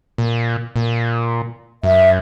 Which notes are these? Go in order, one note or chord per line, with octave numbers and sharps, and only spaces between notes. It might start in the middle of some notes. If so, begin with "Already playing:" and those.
A#2
A#2
F#2 E5